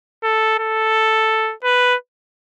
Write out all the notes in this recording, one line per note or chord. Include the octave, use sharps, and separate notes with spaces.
A4
A4
B4